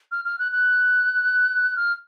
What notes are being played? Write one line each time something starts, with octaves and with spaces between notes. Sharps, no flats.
F6
F6
F#6
F#6
F6